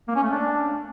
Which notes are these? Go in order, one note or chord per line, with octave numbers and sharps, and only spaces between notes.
A#3
C#4
A3
D4